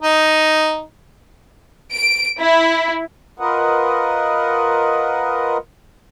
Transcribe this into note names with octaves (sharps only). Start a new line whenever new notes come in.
D#4
D7
E4
F4 A#4 B4 D#5 F#5